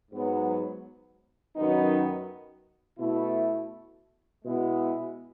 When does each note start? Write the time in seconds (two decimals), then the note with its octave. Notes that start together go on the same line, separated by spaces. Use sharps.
0.11 G#2 F#3 B3
1.54 F#2 D#3 F#3 B3 D#4
2.98 B2 A3 E4
4.42 B2 G#3 B3 E4